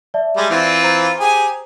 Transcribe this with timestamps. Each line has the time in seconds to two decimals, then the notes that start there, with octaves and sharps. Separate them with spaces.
0.14 D5 E5 A5
0.37 G3 G#3
0.50 E3 C4 F4
0.82 C5 A#5
1.20 G4 G#4 G#5